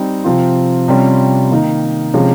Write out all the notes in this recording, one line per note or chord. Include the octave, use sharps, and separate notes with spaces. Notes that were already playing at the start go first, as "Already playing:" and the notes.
Already playing: G3 C4 D#4
C3 F3 C4 F4
C3 G3 C#4 F4
D#3 A#3 D#4
C3 F3 G#3 C#4